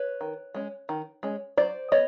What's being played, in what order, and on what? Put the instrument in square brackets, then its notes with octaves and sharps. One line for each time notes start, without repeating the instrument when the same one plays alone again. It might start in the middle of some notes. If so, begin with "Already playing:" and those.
Already playing: [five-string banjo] B4 C#5
D#3
G#3 C#4
D#3
G#3 C#4
F#3 C5 D5
B3 C#5 D#5